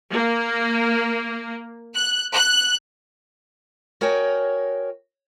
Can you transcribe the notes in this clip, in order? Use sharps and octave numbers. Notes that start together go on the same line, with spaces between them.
A#3
F#6
F#6
F#4 A#4 C#5 D#5 G5 G#5